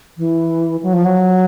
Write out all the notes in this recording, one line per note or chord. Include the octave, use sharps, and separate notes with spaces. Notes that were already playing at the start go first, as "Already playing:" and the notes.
E3
F#3
F3
F#3